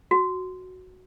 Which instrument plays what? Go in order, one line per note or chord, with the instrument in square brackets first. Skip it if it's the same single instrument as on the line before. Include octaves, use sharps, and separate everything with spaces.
[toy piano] F#4